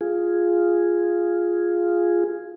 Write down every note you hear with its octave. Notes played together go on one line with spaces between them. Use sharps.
F4 G#4